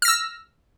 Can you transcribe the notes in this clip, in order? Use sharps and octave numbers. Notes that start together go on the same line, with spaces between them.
E6 F6 A#6